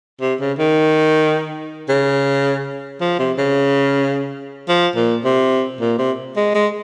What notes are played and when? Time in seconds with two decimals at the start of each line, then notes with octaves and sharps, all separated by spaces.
0.21 C3
0.40 C#3
0.59 D#3
1.89 C#3
3.01 F3
3.19 C3
3.38 C#3
4.68 F3
4.96 A#2
5.24 C3
5.81 A#2
5.98 C3
6.37 G#3
6.55 G#3